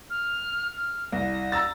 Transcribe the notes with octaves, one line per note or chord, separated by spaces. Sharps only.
F6
F6
C2 A#6
A#5 E6 A6